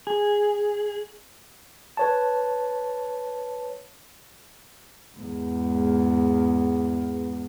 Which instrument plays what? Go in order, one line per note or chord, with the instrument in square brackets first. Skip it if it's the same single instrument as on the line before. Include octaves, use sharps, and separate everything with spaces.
[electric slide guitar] G#4
[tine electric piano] B4 C#5 A5
[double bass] E2 G#2